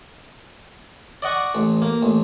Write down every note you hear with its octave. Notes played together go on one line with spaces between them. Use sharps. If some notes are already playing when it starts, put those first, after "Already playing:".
D5 D#5 F#5 C#6
A1
A#3
A1